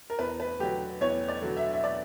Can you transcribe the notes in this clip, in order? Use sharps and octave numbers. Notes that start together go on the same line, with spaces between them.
A#4
E2 B4
B4
D3 F#3 G4
E2 C#5
D5
D3 F#3
E5
E5
D5